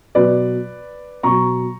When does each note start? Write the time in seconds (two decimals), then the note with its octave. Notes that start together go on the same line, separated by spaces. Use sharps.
0.15 B2 F#3 B4 D5
1.23 B2 F#3 A#5 C#6